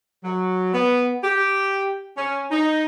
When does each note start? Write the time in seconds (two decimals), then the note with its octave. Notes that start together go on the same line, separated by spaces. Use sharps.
0.24 F#3
0.73 B3
1.23 G4
2.17 C#4
2.51 D#4